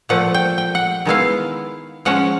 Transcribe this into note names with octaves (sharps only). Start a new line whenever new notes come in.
A#2 F3 A3 F#5
G5
G5
F#5
D#3 G#3 B3 E4 F5
F3 G#3 C#4 F#5